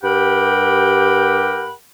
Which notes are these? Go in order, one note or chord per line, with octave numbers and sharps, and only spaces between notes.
G2 G4 A#4 F#5 G5 B5